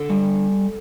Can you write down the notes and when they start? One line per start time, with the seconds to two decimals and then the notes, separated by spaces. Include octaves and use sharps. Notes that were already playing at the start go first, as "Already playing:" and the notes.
Already playing: D3 A4
0.10 G3